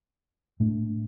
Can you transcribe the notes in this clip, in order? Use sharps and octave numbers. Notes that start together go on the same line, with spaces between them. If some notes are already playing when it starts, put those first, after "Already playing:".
A2 A3 D4